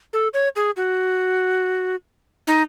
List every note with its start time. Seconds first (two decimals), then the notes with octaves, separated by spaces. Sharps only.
0.13 A4
0.34 C#5
0.56 G#4
0.77 F#4
2.47 D#4